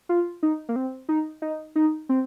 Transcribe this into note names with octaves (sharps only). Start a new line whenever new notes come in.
F4
D#4
A#3
C4
D#4
D#4
D#4
C4